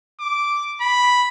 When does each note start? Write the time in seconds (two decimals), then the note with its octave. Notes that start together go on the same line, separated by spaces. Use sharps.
0.20 D6
0.81 B5